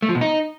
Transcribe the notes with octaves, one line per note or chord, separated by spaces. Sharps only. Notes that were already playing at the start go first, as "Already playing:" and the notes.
A3
F3
B2
D#4